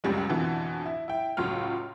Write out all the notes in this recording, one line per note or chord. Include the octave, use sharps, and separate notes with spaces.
C#2 F#2 G3 G#3
F2 B2 D3 E3
E4
E4 G5
C#2 A2 F#3 F4 C6 F6